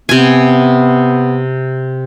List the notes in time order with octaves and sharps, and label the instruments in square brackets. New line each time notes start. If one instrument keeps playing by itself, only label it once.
[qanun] C3 G#5 [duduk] B3